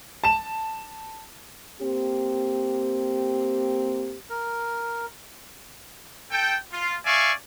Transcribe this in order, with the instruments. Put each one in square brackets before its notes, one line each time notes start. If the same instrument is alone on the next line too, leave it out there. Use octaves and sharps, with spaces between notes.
[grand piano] A5 E7
[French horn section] A#3 C4 G4
[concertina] A#4
[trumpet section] A4 G5
F4
D5 E5 F5 G#5 C#6